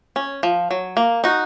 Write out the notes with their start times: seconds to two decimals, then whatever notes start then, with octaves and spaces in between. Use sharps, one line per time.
0.16 C#4
0.43 F3
0.71 F#3
0.97 A#3
1.24 D#4 F#4